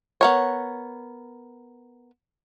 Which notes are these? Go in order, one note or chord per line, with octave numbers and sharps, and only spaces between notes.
B3 A#4 C#5